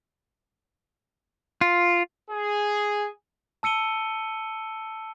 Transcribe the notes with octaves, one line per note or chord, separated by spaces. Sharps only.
F4
G#4
A5 E6 C#7 D#7 G7